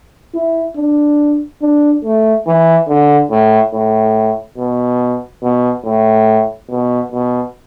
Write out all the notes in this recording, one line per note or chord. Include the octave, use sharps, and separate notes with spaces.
E4
D4
D4
A3
E3
D3
A2
A2
B2
B2
A2
B2
B2